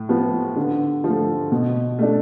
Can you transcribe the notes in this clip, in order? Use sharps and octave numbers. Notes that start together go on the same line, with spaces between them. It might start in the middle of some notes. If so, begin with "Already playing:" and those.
Already playing: A2
F3 B3
D3
F3 A3
B2
A3 D4